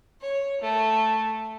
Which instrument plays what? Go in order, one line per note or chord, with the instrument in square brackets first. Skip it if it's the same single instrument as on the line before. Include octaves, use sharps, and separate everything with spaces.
[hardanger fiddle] C#5
A3